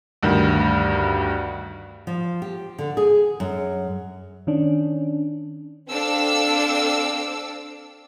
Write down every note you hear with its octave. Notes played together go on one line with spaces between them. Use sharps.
D2 G2 D#3
F3
G4
D3
G#4
F#2
D#3 C#4 D4
C4 D4 A4 F5 D6 E6